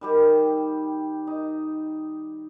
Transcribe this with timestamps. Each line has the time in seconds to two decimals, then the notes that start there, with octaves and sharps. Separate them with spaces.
0.01 D#3 G3 G4
1.27 D#4